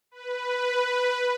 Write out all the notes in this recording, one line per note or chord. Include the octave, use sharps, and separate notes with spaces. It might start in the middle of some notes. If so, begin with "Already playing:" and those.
B4